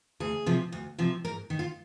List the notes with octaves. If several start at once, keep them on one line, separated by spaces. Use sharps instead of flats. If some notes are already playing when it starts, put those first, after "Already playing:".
D2 G#4
C3 F3
D2
C3 F3
G#2 A#4
D#3
F4